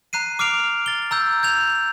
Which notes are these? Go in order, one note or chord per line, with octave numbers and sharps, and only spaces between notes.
A#5 F#6 C7 D#7
D6 F6 C7 D7 F7
A6 G7
A#5 E6 G6
G6 G#6 F7